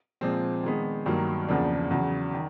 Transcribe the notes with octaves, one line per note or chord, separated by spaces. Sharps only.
A#2 F3 G#3 C4
D#3 G#3 B3
G2 D#3 F#3 A#3
E2 C#3 F3 A#3 D4
E2 C#3 F#3
D#3